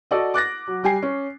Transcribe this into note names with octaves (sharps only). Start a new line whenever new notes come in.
F#4 A4 D5 D#5
D6 F#6 A6 A#6
F#3
G3 G4 G5 G#5 C7
C#4